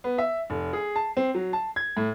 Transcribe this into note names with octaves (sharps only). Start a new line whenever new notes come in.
B3
E5
F1
G#4
A5
C4
F#3
A5
G#6
A2